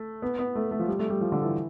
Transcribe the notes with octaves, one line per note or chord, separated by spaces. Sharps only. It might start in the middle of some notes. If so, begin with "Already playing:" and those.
Already playing: A3
B3
B3
A3
A3
F3
G3
A3
G3
F3
D3
E3